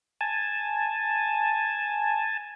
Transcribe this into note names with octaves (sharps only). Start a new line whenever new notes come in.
G#5 A5